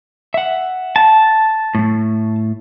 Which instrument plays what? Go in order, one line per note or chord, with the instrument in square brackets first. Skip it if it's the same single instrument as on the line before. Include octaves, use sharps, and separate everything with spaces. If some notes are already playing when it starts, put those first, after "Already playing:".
[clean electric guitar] E5 F#5
[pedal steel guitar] A5
[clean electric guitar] A2 A3